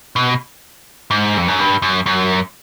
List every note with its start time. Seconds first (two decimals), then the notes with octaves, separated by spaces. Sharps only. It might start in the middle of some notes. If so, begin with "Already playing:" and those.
0.16 B2
1.11 G#2
1.37 F2
1.48 F#2
1.59 G2
1.82 F#2
2.06 F#2